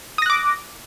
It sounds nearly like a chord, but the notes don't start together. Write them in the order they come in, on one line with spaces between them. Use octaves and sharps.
D#6 A#6 F#6 D6